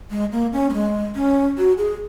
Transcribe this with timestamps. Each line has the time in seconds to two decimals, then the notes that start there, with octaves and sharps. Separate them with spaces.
0.11 G#3
0.32 A#3
0.53 C#4
0.70 A#3
0.73 G#3
1.16 C#4
1.58 F#4
1.78 G#4